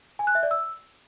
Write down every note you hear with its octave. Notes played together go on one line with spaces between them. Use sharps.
G#5
F#6
E5
D5
E6